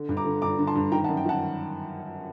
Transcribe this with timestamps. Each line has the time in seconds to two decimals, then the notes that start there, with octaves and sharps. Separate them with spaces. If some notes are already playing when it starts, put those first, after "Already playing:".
Already playing: D3
0.09 G2
0.17 A#5 D6
0.25 D3
0.42 G2 A#5 D6
0.58 D3
0.67 A5 C6
0.75 G2
0.92 D#3 G5 A#5
1.04 F#5 A5
1.08 F#2
1.17 G5
1.26 D#3 F#5 A5